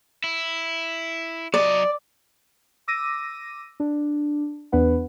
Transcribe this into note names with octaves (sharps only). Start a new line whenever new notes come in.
E4
F#3 D5 D#5
D6 E6 A#6 D#7
D4
E2 B3 D4 B4 F#5